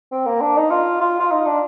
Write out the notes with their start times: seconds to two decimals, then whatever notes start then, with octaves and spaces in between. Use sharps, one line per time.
0.12 C4
0.27 A#3
0.41 D4
0.57 D#4
0.71 F4
1.01 F4
1.20 F4
1.32 D#4
1.46 D4